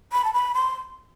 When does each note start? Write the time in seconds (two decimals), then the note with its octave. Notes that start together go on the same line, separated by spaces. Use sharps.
0.13 B5
0.25 A5
0.34 B5
0.55 C6